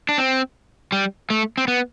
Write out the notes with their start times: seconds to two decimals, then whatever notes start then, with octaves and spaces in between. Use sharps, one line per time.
0.09 D4
0.18 C4
0.92 G3
1.30 A3
1.57 C4
1.68 B3